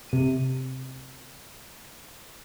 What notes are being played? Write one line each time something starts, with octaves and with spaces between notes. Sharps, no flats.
C3 D#7